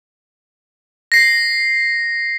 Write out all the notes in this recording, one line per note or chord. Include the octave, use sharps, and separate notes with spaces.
A#6 C7